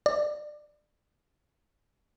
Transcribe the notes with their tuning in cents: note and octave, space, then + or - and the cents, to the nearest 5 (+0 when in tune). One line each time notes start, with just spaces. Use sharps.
D5 +25